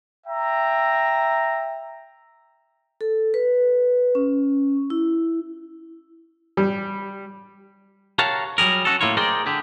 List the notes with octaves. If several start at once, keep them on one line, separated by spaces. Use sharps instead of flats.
E5 G5 A#5
A4
B4
C#4
E4
G3
G4 A#4 C#5 F5 F#5 A5
F#3 G3 G#4 A#4
C#4 F#4 A4
A2 A#3 E4 F4 C#5
G#4 A#4 C5 D5 D#5 G5
D3 G4 G#4